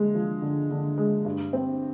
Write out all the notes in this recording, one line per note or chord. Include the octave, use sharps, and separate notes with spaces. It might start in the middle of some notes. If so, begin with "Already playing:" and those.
Already playing: D3 G#3
F3
D3
D3
G#3
G2
C4